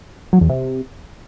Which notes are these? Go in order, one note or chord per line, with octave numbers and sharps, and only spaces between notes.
F#3
E2
C3